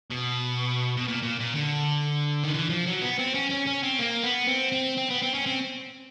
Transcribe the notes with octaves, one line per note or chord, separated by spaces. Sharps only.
B2
B2
A#2
A#2
A#2
D3
D#3
E3
F3
F#3
B3
C4
C#4
C#4
C#4
C4
A#3
B3
C4
C4
C4
B3
C4
C#4
C4